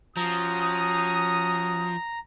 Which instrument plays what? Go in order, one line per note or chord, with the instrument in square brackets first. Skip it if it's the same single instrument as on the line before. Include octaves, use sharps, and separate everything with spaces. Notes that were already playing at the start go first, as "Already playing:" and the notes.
[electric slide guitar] F3 [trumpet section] C#4 F#4 D#6 [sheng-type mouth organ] A#5